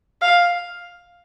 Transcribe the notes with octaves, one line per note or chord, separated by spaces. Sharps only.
F5